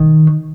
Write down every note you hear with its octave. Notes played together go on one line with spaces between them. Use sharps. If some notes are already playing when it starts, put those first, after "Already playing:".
Already playing: D#3